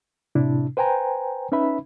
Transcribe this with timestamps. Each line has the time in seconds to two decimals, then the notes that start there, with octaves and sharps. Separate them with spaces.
0.35 A2 C3 D4 E4
0.77 B4 C5 G5 G#5 A#5
1.52 C#4 D#4 B4 E5 B5